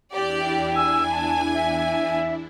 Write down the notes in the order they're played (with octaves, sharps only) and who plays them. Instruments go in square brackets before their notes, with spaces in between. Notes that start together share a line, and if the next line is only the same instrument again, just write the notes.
[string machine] E2 D4 E4 [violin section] G4 D5
[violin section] G#5 [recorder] E6
[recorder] A5
E5